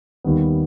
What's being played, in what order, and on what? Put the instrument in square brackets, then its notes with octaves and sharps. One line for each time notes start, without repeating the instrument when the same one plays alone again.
[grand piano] D#2 D#3 G3 B3